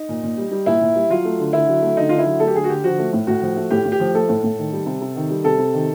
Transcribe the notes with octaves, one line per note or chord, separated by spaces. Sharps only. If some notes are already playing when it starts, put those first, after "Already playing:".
Already playing: D#4
A#2
A#2
G3
G3
A#2 E4
A#2
G3
F#3 F4
A3
D3
D3 E4
F#3
A3
D3 D#4
D3 F4
E4
F#3
A3 A4
G4
D3 G#4
F#4
D3 G4
F3 F#4
A3
A2
A2 F#4
F3
A3
A2 G4
A2
G4
F3
A3 A4
A2
A2
D#3
G3
C3
C3
D#3
G3
C3 A4
C3
D#3